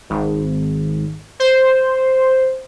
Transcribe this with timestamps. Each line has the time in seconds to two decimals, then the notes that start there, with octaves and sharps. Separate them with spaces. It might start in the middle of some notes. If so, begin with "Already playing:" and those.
0.10 G#1
1.40 C5